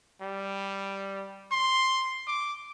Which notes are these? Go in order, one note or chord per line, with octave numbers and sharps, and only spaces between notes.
G3
C6
D6